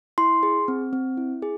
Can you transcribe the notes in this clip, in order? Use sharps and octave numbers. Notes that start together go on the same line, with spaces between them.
E4 C6
G#4
C4
C4
E4
G#4